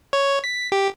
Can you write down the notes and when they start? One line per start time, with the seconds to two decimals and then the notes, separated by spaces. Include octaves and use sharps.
0.13 C#5
0.44 B6
0.72 G4